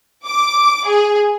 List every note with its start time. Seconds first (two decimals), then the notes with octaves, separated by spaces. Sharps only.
0.25 D6
0.86 G#4